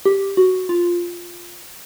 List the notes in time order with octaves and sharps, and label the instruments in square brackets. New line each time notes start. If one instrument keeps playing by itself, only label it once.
[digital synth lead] G4
F#4
F4